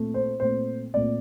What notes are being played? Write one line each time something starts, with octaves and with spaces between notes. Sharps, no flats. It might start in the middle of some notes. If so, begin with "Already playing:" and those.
Already playing: A#2 A3 C4
C5
A#2 A3 C4 C5
A#2 A3 C4 D5